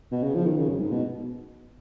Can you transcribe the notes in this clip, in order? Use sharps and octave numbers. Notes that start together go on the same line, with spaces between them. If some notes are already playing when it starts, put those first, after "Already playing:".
B2
C#3
F3
D#3
C#3
F#2
G#2
B2